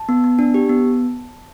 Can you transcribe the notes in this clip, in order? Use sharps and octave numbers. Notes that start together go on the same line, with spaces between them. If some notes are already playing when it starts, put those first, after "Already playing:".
Already playing: A5
B3
B3
D4
G4
B3